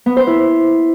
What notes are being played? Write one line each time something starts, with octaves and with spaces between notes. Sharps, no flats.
B3
C5
E4